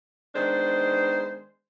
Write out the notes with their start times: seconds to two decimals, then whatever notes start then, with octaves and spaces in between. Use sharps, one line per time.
0.35 D#3 G#3 B3 D4 C5